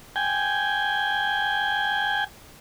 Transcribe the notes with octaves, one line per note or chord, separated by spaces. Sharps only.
G5 G#5